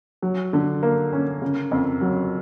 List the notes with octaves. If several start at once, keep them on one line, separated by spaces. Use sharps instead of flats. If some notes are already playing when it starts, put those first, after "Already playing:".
F#3
D3
A#3
C#4
C#3
F2
F#3